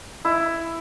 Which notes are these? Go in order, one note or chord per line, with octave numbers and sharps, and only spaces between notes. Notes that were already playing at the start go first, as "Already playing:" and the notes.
E4